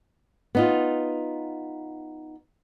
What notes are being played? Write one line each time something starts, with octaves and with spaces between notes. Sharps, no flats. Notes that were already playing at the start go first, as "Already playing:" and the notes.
B3 D#4 F4